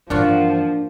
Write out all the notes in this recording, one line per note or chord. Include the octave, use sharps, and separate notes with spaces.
G2 A#2 E3 F3 D4 F4 F#4